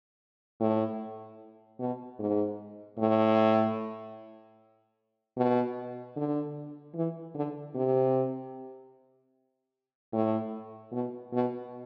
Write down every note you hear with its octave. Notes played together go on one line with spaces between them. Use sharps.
A2
B2
G#2
A2
B2
D3
E3
D3
C3
A2
B2
B2